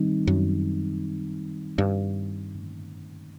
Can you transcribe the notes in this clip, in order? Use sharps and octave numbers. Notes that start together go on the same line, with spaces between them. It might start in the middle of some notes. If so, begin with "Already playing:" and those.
Already playing: D#3 G3 C4 D#4
F#2
G2